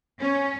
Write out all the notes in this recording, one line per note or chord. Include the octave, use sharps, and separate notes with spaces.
C#4